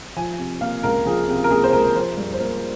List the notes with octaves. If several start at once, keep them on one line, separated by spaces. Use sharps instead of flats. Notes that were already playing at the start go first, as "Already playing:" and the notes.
F3 G#5
C3
A#3 F5
C#2 A#4
F3 G#4
C3
A#4
A#3 G#4
C5
C#2 A#4
F3 C5
G2
C5
A#3 A#4